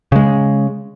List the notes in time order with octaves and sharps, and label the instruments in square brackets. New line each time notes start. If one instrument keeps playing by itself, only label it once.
[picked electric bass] C#3 G#3